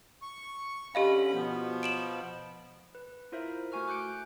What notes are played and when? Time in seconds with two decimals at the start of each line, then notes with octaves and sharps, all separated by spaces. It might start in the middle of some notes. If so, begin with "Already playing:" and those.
0.22 C#6
0.95 D3 C#4 G4 D#5 F5 B5
1.33 B2 F3 B3
1.83 D7 E7 F#7
2.95 B4
3.32 E4 F4 A#4 C5 E5
3.72 A3 F#4 G#5 C#6 F6
3.88 D6 F#6 G6 C#7 D7